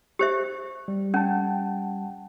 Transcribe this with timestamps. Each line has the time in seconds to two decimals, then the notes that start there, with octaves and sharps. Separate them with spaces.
0.19 G4 C5 E5
0.88 G3
1.14 C#4 F#5 G5 A5